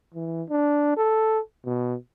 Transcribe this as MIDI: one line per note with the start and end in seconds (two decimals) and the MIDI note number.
0.15 0.43 52
0.50 0.93 62
0.97 1.40 69
1.66 1.95 47